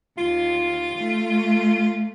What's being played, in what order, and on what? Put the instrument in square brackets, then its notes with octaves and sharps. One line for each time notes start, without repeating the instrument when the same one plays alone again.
[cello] D#2 [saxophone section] F4
[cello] A3